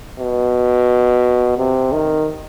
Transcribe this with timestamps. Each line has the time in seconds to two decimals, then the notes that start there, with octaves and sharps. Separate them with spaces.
0.20 B2
1.58 C3
1.92 D#3